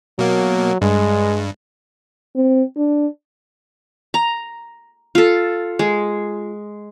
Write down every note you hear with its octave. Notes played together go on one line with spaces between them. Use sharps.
B2 F#3 A#3
G2 G#3
C4
D4
A#5
F4 A4
G#3